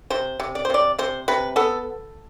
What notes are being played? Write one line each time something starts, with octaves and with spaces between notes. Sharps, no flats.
C3 C5
C3
D5
C5
C3 D5
C3 C5
C3 B4
B3 A4